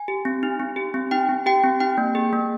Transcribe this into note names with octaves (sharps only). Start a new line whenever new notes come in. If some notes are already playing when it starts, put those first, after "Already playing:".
Already playing: G#5
G4
C4
D#4
C4
G4
C4
D#4 G5
C4
G4 G5
C4
D#4 G5
A#3
G#4
A#3